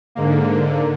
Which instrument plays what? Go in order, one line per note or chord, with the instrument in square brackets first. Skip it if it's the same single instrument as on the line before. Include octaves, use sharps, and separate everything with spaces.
[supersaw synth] G#2 A#3 [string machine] D3